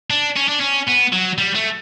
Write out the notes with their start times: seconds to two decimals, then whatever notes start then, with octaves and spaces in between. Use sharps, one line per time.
0.10 D4
0.36 C#4
0.48 D4
0.60 C#4
0.87 B3
1.13 F#3
1.38 G3
1.56 A3